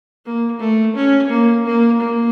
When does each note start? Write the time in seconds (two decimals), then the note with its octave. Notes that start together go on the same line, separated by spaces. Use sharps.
0.25 A#3
0.59 A3
0.96 C#4
1.30 A#3
1.66 A#3
2.00 A#3